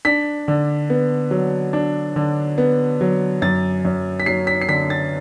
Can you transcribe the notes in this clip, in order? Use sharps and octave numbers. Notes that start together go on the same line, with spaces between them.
D4 B6
D3
B3
F#3
D4
D3
B3
F#3
F#2 A6
F#2
B6
F#3 C7
B6
C7
D3 B6
A6